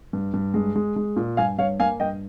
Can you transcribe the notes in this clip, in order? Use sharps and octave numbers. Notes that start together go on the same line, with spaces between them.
G2
G2
G#3
G#3
G#3
A#2
G2 F5 G#5
G2 C#5 F5
A#3 F5 G#5
G2 D#5 G5